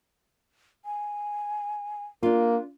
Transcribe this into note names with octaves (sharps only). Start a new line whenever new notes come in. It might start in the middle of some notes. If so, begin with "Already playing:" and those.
G#5
A#3 D4 F4 A#4